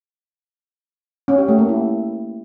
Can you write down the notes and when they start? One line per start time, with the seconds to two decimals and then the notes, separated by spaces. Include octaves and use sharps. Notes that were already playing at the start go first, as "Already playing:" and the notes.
1.28 C#4
1.38 G4
1.48 A3
1.59 A#3
1.69 E4